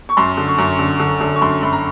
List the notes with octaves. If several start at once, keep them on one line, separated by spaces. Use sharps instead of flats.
C#6
F#2 C6
D3
C#6
F#2
D3
D3
D3
C#6
F#2 C6
F#2 B5
A#5